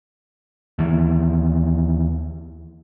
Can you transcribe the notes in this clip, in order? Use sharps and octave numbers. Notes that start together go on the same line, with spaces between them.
D#2 E3